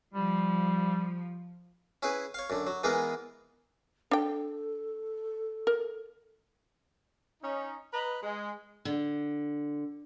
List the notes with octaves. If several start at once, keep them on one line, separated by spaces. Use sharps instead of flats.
F3 G3
C#4 E4 G#4 B4
C#5 F5
F#2 D3
F#3
E3 G#3 B3 F4 G#4 A#4
D4 A4 G5
A#4
C#4 D#4
B4 D#5 A#5 B5
G#3
D3